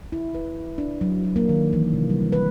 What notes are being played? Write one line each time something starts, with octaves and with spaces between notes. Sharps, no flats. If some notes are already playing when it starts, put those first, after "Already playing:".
E4
B4
D4
F#3
F#3
A#3
D#3
E3
C3
G3
B4